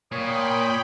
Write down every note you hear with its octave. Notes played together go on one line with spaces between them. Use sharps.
A#2 C#5 G5 B5 D#6